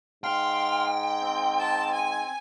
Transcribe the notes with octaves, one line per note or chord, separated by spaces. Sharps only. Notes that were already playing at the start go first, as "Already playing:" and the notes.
G#2 F5 G5 C6 F6
C4
A5
G#5